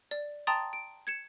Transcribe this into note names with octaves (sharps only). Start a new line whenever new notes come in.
D5
G5 A5 A#5 C6 D#6 A6
D7
G#6 C#7 E7